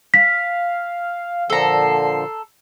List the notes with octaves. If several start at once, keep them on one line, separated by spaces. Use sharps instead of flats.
F5 B6
A#2 D3 F3 A4 A#5 C7